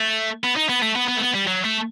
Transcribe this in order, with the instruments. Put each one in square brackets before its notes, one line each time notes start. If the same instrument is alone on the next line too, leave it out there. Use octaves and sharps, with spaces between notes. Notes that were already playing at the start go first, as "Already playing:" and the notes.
Already playing: [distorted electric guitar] A3
B3
D#4
B3
A3
B3
B3
A3
B3
G3
F#3
A3